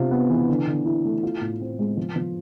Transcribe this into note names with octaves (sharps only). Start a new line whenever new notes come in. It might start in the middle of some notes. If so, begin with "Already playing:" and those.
Already playing: C3 F4
B3
E3
D3
D3
E4
A3
F4
A2
C4
G#3
F3
F3